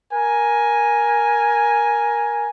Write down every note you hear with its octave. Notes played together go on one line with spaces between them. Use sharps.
A#4 G#5